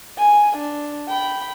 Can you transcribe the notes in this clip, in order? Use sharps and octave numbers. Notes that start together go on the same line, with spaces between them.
G#5
D4
G5 B5